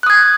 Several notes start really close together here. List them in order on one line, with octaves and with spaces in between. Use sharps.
F#6 D#6 G#6